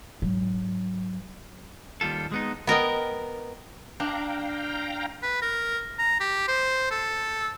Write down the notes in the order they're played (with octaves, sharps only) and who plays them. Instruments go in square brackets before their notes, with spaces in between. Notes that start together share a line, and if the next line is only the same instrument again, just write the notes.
[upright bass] G#2 F#3
[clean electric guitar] D#2 G3 F4 A4
G#3 B3 D#4
[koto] B3 A#4 D#5 G5
[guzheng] D4 [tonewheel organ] F5 G5 A#5
[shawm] B4
A#4
A#5
G4
C5
A4